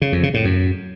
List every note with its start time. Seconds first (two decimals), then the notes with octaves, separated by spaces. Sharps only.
0.02 C#3
0.12 F2
0.23 C#3
0.34 A2
0.45 F#2